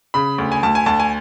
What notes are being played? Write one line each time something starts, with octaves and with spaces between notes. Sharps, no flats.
C#3 B5
D2
G#5
D2 A5
G#5
D2 A5
G#5